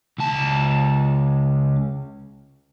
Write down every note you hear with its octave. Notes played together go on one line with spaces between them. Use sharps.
C#2 A5